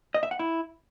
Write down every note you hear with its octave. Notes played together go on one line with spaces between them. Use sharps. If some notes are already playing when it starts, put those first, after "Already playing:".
D#5
E5
F#5
E4